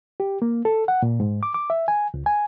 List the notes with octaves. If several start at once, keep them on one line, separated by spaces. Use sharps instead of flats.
G4
A#3
A4
F#5
A#2
G#2
D6
D6
E5
G#5
C#2
G#5